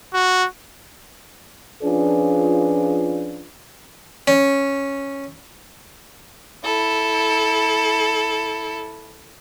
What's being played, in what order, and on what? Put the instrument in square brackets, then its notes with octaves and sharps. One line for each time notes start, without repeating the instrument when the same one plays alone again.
[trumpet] F#4
[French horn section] F3 C#4 D4 F4 G#4 B4
[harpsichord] C#4
[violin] E4 A4